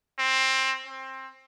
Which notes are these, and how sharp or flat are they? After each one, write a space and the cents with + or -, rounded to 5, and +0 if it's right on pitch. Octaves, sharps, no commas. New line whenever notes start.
C4 +15
C4 +20